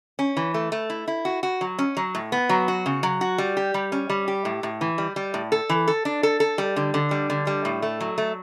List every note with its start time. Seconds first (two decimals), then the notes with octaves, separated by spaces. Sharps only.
0.19 C#4
0.37 E3
0.54 A3
0.72 A3
0.90 E4
1.07 E4
1.25 F#4
1.43 F#4
1.61 F#3
1.79 C#4
1.97 F#3
2.15 A2
2.32 B3
2.49 F#3
2.68 F#4
2.86 C#3
3.03 F#3
3.21 F#4
3.38 G3
3.57 G4
3.74 G3
3.92 C#4
4.09 G3
4.28 G4
4.45 A2
4.63 A2
4.81 E3
4.98 G3
5.16 G3
5.34 A2
5.52 A4
5.69 E3
5.88 A4
6.05 D4
6.23 A4
6.40 A4
6.58 G3
6.76 D3
6.94 D3
7.11 G3
7.30 D3
7.47 G3
7.65 A2
7.82 A3
8.00 F#3
8.18 A3